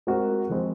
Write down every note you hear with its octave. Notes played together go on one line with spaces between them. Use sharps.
G#3 C4 F#4 A#4
F3 G#3 C4 F#4